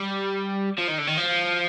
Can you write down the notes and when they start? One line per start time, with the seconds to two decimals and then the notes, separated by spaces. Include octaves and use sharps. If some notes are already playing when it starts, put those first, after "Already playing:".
Already playing: G3
0.78 F3
0.88 D#3
0.98 D3
1.07 D#3
1.17 F3